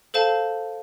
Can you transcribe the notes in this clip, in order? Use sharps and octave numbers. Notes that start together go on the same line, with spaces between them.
A4 C5 F5 A5